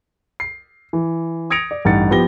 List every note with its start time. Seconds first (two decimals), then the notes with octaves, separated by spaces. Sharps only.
0.40 C7
0.93 E3
1.50 D#6 G#6 A#6 C#7 D7 F7
1.71 D5
1.85 A1 G2 D#4 F#5 A6 C#7
2.11 F3 B3 G4 A#6 G7